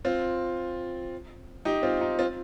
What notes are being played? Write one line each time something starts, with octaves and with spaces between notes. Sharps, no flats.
C4 F4
D#4 G4
C4 F4
D#4
C4 F4